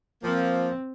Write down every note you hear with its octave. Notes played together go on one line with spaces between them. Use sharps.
F3 A#3 C4